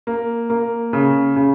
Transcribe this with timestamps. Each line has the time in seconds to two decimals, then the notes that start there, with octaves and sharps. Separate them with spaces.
0.07 A#3
0.50 A#3
0.93 C#3
1.36 C#3